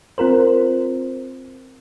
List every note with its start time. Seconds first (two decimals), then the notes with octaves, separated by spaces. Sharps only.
0.18 C4 F4 A#4 C5